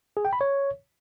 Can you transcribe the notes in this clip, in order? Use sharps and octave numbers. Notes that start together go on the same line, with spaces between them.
G#4
G5
B5
C#5